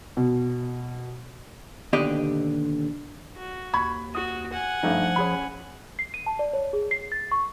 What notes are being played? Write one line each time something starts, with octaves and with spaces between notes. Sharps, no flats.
B2
D#2 B2 D3 G4 D5 D#5
F#4
D#2 B5 C#6 G#6
F#4 D#6
F#5 G#5
G2 F3 A3 D#4
C#4 G#4 B5
C7
D#7
A5
D5
C#5
G#4
C7
A6
C#6